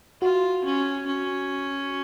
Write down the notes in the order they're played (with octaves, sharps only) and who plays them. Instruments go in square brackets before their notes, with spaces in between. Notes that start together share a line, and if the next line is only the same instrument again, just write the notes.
[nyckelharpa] F4 [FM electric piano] F#4
[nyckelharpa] C#4
C#4